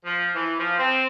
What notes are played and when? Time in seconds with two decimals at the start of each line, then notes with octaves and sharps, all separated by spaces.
0.05 F3
0.35 E3
0.60 F3
0.79 C4